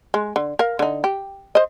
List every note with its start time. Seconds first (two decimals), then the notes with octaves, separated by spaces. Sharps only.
0.14 G#3
0.36 D3
0.59 A#4 F5
0.79 D3 D#4
1.04 G4
1.55 C5 D#5